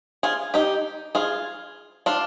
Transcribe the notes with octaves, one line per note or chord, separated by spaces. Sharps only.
F4 G#4
D#4 G4
F4 G#4
D4 F4